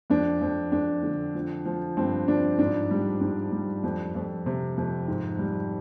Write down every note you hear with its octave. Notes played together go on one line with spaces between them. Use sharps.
F2 D4
F2
F2 D4
D3
F3
F3
G2 C4
F3 D4
G#2 D4
G3
G#2 D4
G3
F2
F2
C3
F2
G#2
G3